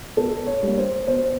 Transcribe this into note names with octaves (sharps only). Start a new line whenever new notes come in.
B2 A4
C#5
G3 A#3
C5
B2 C5